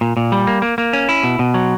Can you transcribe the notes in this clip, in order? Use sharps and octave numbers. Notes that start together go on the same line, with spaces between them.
A#2
A#2
G3
A#3
A#3
A#3
C#4
E4
B2
B2
F#3